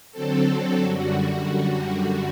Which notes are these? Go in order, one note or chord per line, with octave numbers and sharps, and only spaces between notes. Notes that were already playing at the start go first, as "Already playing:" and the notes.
D3 F#3 C4 A4
F#2 D3 G3 F#4